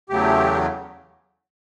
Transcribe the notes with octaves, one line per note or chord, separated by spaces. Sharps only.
E2 C#3 F#3 A3 G4